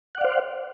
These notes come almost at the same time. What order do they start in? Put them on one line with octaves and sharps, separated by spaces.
F#5 D5 F5 C5